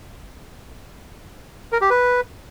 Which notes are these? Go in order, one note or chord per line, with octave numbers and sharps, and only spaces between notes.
A#4
G4
B4